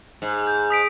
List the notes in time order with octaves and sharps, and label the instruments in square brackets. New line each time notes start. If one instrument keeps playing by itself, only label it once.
[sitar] G#2
[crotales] G6
D#6 B6 D7